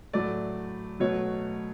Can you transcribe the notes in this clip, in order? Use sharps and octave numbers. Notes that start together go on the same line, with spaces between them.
A2 F#3 A3 D5
B2 F#3 A3 C#5